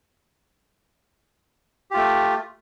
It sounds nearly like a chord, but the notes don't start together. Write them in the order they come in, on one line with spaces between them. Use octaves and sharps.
G4 F4 A3